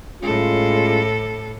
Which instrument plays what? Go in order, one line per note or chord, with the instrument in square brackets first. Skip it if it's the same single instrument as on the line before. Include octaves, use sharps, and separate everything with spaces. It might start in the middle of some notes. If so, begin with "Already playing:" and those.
[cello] A2 A4 [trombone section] G#3 C#4 F4